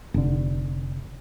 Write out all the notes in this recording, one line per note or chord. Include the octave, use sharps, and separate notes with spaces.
F1 D3